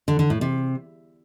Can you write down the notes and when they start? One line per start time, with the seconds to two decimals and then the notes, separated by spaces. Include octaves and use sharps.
0.08 D3
0.19 D3
0.30 A2
0.41 C3